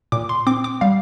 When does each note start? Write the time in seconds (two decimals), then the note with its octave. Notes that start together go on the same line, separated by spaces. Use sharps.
0.12 A#2 D6
0.29 C6
0.47 C4 D6
0.64 D6
0.81 G3 F5